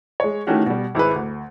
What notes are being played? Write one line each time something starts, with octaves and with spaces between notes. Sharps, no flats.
G#3 C#5
D#3 E3 A3 C#4 F#4 G4
B2 G3
G#1 E4 G#4 B4
D2